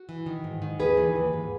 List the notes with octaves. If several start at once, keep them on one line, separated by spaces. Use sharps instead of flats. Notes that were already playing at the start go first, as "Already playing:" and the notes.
Already playing: F#4
E3
D#3
G#2
D#3
D#2 G#4 B4
E3
D#2
G#2